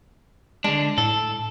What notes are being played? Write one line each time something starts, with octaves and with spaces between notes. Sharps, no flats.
D3 G#3 D4
A2 A4